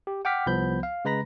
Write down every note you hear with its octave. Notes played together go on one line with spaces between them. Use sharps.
G4
F#5 G5 D6 F6 B6
C2 F3 B3 B5 G6
F5
C#3 G#3 B4 A#5 B5 A#6